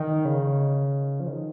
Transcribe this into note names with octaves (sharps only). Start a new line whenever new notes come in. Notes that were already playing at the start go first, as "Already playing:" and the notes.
Already playing: D#3
C#3
F3
D#3